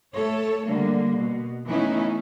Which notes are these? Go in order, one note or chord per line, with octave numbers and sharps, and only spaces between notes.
A3 A4 C#5
D3 G3 A#3
B2
E3 A3 B3 C#4 D#4 E4